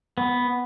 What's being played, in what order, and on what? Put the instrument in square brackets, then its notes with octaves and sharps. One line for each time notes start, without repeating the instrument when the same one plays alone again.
[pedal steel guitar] B3